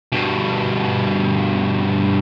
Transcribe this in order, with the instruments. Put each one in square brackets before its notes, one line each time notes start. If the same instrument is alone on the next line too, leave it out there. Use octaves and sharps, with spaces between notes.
[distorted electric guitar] G2 B2